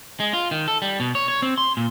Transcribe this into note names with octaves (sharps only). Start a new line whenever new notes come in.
G#3
F4
D#3
A4
G3
B2
C#5
C#5
C4
C6
A#2